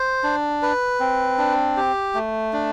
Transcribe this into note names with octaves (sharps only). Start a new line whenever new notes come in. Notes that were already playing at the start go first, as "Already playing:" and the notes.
Already playing: C5
D4
B4
C4
D4
G4
A3
D4